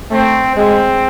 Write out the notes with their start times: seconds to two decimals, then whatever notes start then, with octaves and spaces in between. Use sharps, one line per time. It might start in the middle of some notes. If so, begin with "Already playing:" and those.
0.11 A3 C4
0.55 G#3 C4